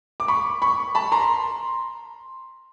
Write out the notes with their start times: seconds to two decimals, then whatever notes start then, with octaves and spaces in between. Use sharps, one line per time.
0.20 D6
0.28 B5 C#6
0.62 B5 C#6
0.95 A5 B5
1.12 A#5 C6